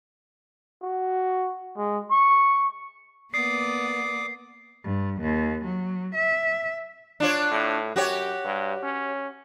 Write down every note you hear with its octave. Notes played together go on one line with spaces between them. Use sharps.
F#4
G#3
C#6
A#3 B3 D5 D6 D#6 C7
G2
D#2
F#3
E5
D4 F4 C#5
A2
F#2 F#4 G4 C#5
G2
C#4